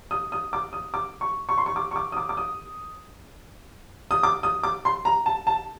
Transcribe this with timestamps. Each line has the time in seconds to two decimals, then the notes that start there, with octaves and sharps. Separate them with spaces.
0.11 D#6
0.32 D#6
0.53 D6
0.73 D#6
0.94 D6
1.21 C#6
1.49 C#6
1.58 C6
1.66 C#6
1.76 D6
1.91 C#6
1.96 D6
2.12 D#6
2.17 D6
2.29 D6
2.37 D#6
4.11 D#6
4.23 D6
4.43 D#6
4.63 D6
4.85 C6
5.05 A#5
5.26 A5
5.47 A5